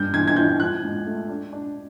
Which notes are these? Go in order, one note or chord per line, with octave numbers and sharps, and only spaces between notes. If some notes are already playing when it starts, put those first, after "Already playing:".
Already playing: G2 G6
E3 G#6
G#6
E3 G6
F3 F#6
G#2
A3
D4
D4